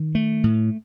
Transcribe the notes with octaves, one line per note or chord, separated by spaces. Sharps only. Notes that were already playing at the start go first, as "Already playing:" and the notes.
Already playing: D#3
A3
A2